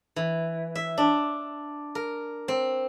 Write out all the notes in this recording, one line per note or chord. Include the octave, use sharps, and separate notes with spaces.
E3
E5
D4
A#4
C4